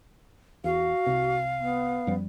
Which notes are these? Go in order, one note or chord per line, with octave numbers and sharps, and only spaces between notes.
E2 F#4 F5
C2 C3
B3
F#2 F3 G3